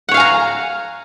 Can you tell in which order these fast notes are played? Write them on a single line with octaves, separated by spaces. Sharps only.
F#5 C#5 F5 G#5 A#5